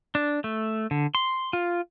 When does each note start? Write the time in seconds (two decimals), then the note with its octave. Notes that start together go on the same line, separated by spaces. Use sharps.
0.15 D4
0.44 A3
0.91 D3
1.15 C6
1.53 F4